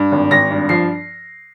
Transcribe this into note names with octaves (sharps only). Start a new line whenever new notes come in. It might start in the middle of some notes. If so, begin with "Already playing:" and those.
Already playing: G2
G#1
G#1 A#6
G2
F3 C7